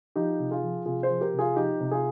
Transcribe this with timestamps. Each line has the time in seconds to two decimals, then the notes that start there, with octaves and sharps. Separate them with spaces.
0.15 F3 D#4 G4
0.39 C3
0.51 F4 G#4
0.63 F3
0.85 C3 F4 G#4
1.03 G#4 C5
1.09 F3
1.21 G4 A#4
1.33 C3
1.39 F4 G#4
1.56 F3 D#4 G4
1.80 C3
1.91 F4 G#4